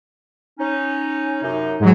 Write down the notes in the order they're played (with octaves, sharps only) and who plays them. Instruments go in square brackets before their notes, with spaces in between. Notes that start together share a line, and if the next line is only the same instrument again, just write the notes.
[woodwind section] C#4 D#4
F#2 C3 D#4
[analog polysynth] G#2 F#3